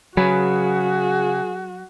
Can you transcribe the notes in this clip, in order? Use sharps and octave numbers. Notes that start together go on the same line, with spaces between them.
C#3 F#3 F#4 G#4 B4 G#5